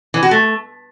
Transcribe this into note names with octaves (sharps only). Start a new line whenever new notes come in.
E3
F#4
A3